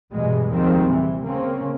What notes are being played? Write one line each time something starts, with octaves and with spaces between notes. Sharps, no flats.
E2 G2 B2 G3 G#3
D#2 D#3 F3 G3 G#3 C4
C3 E3
C#3 A#3 C4 C#4